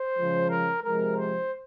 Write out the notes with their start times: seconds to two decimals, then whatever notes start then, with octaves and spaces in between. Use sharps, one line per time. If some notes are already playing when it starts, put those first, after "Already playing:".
Already playing: C5
0.18 C#3 F3 G#3
0.50 A#4
0.83 C3 F3 G#3 A#4
1.16 C5